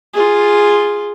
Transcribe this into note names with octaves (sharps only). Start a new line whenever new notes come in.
F4 G#4